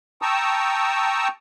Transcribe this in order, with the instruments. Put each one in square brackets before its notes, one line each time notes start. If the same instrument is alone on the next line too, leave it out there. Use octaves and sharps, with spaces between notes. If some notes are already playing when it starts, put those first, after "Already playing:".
[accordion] G5 A5 A#5 C#6 D#6 E6